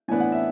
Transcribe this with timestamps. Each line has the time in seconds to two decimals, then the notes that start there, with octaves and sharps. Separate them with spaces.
0.08 A2 E3 B3 D4 G#5
0.20 F#5
0.32 E5